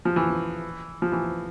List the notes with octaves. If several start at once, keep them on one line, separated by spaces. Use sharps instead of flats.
F3
E3
F3
E3